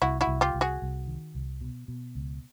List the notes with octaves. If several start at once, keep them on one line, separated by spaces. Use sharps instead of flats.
C2 E4 F#4
E4 F#4
C2
F4 G4
C2
F#4 G#4
C2
D#3
C2
B2
B2
C#2